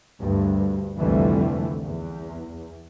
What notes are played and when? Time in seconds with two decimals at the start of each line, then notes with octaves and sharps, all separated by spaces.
0.20 D2 G2
0.97 C2 F2 D3 E3 G3 A3
1.83 E2